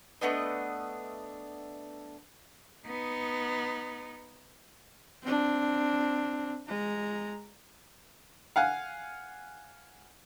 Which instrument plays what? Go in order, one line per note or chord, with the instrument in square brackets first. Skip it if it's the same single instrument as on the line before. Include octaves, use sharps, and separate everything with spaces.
[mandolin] A3 B3 D4 D#5
[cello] B3 D#4
[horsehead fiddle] C4 D4
G#3 A#5
[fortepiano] F5 F#5 G#5